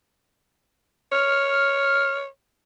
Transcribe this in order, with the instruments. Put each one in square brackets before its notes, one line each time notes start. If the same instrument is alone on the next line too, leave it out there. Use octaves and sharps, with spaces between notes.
[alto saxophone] C#5 [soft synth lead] F6